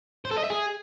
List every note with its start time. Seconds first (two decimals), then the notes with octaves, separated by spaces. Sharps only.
0.25 C5
0.31 A4
0.37 D#5
0.44 E5
0.50 G#4